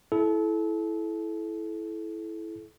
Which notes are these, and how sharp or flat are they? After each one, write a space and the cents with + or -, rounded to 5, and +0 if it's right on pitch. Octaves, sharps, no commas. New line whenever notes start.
E4 +0 A4 -30